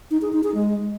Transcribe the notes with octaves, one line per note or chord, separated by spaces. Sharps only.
D#4
G#4
D#4
G#4
G#3